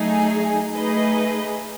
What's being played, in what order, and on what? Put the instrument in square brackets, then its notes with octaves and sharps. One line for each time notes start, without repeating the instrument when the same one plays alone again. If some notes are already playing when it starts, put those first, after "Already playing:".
Already playing: [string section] F#3 A3 D#4 G#4
A3 D#4 G#4 B4 D#5